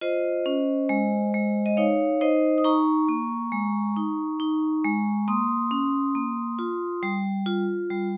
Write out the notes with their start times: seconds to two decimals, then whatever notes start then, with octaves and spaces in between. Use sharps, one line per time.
0.01 F4 C5 D#5
0.46 C#4
0.89 G#3
1.34 G#3
1.66 D#5
1.77 D#4 C#5 F5
2.21 D#4 C5 D#5
2.58 D#6
2.64 D#4 A#5 C#6
3.09 A#3
3.52 G#3
3.96 D#4
4.40 D#4
4.84 G#3
5.28 A#3 C6 D#6
5.71 C#4
6.15 A#3
6.59 F4
7.03 G3
7.46 F4
7.91 G3